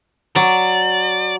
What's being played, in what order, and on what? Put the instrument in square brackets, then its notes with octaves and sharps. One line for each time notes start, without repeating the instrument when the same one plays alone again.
[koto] F#3 [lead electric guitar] D5